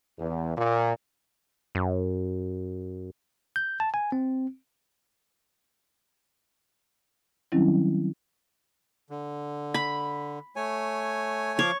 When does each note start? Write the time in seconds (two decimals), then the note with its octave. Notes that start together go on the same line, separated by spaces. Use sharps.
0.18 E2
0.55 A#2
1.75 F#2
3.56 G6
3.80 A5
3.94 G#5
4.12 C4
7.52 D#3 F#3 G3 C4 C#4 E4
9.10 D3
9.74 B5
10.56 A3 C#5 G#5
11.59 F3 C#5 F5 D6